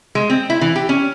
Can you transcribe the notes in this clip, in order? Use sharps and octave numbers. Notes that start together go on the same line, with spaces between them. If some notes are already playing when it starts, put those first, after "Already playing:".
G#3
C4
E4
E3
G4
C#4